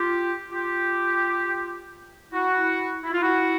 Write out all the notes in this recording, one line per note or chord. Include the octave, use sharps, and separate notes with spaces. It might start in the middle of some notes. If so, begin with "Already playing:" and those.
Already playing: F4 G4
F4 G4
E4 F#4
E4
F4
E4 F#4